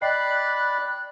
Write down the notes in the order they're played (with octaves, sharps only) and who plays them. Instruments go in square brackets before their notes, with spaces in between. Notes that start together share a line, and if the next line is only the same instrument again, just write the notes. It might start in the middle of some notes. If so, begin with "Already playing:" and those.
[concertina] D5 B5 [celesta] D#5 G5 C7 [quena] F#6